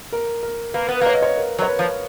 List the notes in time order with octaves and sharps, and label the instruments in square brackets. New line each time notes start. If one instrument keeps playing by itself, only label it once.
[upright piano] A#4
A#4
[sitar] A#3 [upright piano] B4
[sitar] B3
[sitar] A#3 [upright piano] C#5
[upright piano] D#5
C#5
A#4
[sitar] F#3
[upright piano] C#5
B4
[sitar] F3